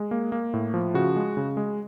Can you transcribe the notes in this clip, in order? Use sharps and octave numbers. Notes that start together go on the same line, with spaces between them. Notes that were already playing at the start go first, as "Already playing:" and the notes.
Already playing: G#3
A#3
A#3
A2
F3
C#3 F#4
G#3
C#3
G#3